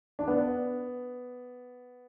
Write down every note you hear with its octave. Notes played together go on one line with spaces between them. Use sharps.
D4
B3